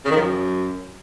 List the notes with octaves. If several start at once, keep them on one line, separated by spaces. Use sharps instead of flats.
C#3
D#3
F3
F#2